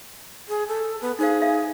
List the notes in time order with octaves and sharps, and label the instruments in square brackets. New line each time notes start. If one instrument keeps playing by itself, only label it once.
[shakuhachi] G#4
A4
B3
[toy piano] D#4 C5 F5 [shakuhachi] G#4
[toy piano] E5 F5